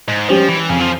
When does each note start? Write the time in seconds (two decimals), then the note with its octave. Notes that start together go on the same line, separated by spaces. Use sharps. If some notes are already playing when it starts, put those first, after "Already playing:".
0.08 G#2
0.29 F3 G3 C#4 G4 C5
0.49 E3
0.69 F2 C#3
0.80 F3